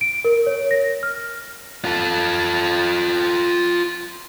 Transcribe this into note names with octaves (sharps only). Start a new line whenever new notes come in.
D7
A#4
C#5
A#6
F6
F4 A4